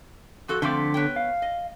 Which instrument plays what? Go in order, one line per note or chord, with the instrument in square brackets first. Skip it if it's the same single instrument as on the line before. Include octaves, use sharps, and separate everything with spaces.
[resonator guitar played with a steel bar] F3 F#4 A4
[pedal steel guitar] D3 D6 [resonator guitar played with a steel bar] F3 A3 C4
[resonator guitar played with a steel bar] B3 C#5 G5
[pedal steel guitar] F5
[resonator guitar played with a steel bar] D#5